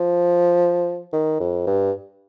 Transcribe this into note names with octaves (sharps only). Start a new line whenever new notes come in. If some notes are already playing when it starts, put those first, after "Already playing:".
Already playing: F3
D#3
F2
G2